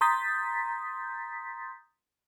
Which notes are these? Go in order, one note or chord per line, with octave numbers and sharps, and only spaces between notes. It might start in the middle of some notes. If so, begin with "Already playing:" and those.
A#5 C6 D#6 G6 A6 B6